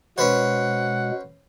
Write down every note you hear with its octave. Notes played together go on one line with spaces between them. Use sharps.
B2 G#3 C#4 B4 C5 F#5